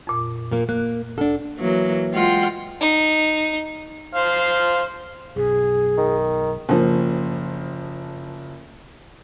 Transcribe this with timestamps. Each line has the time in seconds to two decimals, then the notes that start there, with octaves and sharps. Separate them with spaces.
0.07 F2 A#2
0.51 A#2 A#3
0.69 A#3 F#6
1.18 D2 D4 A4
1.58 E3 F#3 A#3
2.14 G#3 F4 F#5 G5
2.80 D#4
4.15 C5 F5
5.36 B1 F#2 B2 G#4
5.98 D#3
6.69 F#1 F3